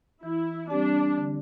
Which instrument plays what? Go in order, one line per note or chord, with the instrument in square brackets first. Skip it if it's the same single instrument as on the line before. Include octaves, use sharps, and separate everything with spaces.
[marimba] E3 [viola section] E4
[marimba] G3 C4 G4 [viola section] D4
[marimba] D3